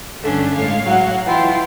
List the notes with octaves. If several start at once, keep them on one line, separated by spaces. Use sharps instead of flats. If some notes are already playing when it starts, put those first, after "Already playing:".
G2 D3 A3 C#4 D4
A2 G#3 C#5 F5
F#3 F#5
E3 E4 F4 G5